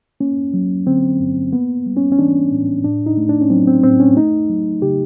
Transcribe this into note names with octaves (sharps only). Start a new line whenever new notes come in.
A#3 C#4
F#3
D3 C4
G2
A#3 B3
G3
C#4
C#4
E3 D4
A2
A2 D4
D#4
A3
D4
C#4
F#3 C4
C4
A2 C4
C#4
A3 D#4
F#3
C#3 G4